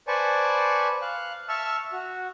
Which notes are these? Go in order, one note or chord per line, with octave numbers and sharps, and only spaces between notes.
B4 C5 D5 G#5 A5 C#6
F5 F#6
E5 A5 C#6 E6 F6
F#4